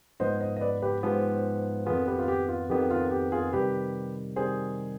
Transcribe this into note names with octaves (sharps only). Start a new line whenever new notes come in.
G#2 F3 B3 C5 D#5
C5 D#5
D#5
B4 D5
G4 B4
G#2 F3 B3 G4
F2 D#3 B3 F4 G#4
G4 B4
F4
G4
F4
F2 D#3 B3 G4
F4
G4
F4 G#4
C3 D#3 G3 G4 B4
C3 D#3 G3 G#4 C5